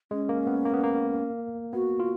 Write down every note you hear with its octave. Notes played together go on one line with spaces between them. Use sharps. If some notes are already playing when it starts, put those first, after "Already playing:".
G#3 C#4
A#3
B3
A#3
B3
A#3
B3 F#4
F4